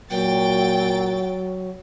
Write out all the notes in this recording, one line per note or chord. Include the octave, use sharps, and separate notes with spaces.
A#2 F#3 G5 A6